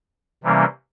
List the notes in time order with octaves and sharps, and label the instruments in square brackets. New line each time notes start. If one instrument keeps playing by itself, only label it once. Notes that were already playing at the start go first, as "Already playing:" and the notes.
[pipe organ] C3 E3 G3 A#3 C#4